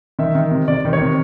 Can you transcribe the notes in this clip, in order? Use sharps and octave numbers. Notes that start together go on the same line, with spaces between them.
D#3 E5
D#3
C3
C3 D5
D#3
C#5
C3